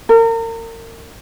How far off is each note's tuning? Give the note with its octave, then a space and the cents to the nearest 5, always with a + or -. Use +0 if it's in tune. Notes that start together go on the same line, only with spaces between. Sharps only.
A#4 -35